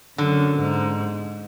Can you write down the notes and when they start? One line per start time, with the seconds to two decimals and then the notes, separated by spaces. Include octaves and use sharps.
0.18 F#2 D3
0.59 G#2